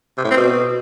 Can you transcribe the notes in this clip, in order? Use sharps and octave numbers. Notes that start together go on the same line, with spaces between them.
C3
A2
C4
B2